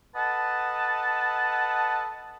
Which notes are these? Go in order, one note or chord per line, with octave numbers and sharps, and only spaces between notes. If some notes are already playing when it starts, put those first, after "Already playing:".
A4 B4 D#5 F#5 A5